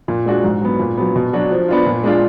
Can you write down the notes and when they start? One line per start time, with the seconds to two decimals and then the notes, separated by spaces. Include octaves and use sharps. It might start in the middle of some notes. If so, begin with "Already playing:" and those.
0.08 A#2
0.26 G#3 D4 F#4
0.44 G#2
0.62 F#3 B3
0.79 A#2
0.97 F#3 B3
1.16 B2
1.33 F#3 D4 F#4
1.51 F3
1.68 B3 D4 F4
1.86 A#2
2.04 G#3 D4 F4